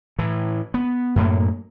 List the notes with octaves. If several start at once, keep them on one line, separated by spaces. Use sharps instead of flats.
A2 E3
B3
F#2 A2 A#3